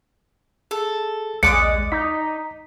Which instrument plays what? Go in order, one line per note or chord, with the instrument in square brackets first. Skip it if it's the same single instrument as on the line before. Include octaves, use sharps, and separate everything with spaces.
[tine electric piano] G#4 [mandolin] A4
[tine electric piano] A#1 D#2 F#6 [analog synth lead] G#3 [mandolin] D5 D6 D#6 [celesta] C#7
[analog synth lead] D#4 [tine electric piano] B6